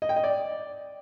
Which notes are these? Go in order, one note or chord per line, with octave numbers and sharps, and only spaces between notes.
D#5
G5
D#5
D5